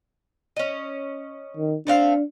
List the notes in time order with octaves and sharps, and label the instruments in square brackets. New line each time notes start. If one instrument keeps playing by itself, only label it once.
[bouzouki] C#4 D#5
[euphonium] D#3
[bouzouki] A3 C4 F5 [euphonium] D4